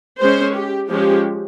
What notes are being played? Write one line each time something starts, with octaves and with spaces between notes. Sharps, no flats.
G#3 C#4 C5
G4
F3 G#3 C#4 G4